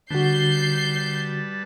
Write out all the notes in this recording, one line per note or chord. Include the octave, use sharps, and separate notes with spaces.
D3 G3 F#4 B4 A5 G6 C7